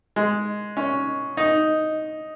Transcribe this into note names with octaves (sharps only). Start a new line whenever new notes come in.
G#3
C#4
D#4